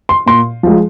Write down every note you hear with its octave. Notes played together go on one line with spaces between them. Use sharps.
C6
A#2 C6
F3 G#3